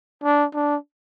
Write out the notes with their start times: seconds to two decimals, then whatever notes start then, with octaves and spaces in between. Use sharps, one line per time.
0.24 D4
0.55 D4